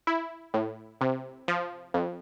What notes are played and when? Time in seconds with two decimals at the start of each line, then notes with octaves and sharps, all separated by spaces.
0.07 E4
0.54 A2
1.01 C3
1.48 F3
1.94 F2